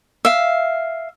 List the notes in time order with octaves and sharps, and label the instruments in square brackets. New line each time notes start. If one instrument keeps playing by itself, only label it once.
[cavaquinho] E5 F5